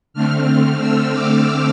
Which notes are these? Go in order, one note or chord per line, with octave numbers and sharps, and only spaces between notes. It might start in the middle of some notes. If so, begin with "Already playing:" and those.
D3 A3 C4 F6
E6
D6